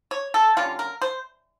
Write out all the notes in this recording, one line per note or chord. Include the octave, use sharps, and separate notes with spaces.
C#5
A4
D3 G3 A#3 C#4 F4
A#4
C5